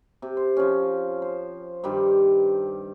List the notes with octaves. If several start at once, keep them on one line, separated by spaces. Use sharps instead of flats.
C3
C5
F3 C#4
C5
G2 D#3 G3